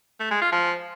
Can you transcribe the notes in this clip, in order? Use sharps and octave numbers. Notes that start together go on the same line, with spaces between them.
A3
G#3
F4
F3